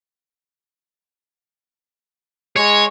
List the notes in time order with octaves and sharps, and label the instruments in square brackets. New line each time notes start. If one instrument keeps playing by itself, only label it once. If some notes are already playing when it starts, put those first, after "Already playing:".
[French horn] G#3 [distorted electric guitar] C#5